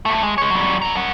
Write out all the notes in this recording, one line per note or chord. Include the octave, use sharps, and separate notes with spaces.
G2 A3
G#3
G#3 C#5
F#3 G3
C#5 A#5
A#4 F#5